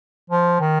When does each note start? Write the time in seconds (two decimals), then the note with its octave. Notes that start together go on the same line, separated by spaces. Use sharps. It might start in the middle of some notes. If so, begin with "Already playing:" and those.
0.30 F3
0.60 D#3